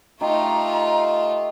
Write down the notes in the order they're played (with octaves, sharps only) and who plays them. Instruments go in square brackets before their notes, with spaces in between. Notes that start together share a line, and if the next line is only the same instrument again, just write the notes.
[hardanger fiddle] A3 F4 [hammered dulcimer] D#4 G4 [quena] A#5